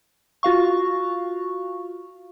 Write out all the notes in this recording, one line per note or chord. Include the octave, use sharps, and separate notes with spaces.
F4 F#4 F5 C#6